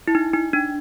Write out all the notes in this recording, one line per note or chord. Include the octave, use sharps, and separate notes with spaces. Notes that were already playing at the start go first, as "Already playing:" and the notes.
E4
D#4
D#4
D4